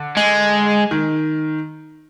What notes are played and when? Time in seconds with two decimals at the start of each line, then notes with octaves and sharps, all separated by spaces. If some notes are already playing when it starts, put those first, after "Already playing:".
Already playing: D3
0.17 G#3
0.91 D#3